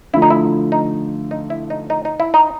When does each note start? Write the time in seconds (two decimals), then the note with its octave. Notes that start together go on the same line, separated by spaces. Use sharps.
0.13 D3 F3 A3 E4
0.22 D#4
0.30 E4
0.72 D#4
1.31 D#4
1.50 E4
1.70 D#4
1.90 D#4
2.05 D#4
2.20 E4
2.34 D#4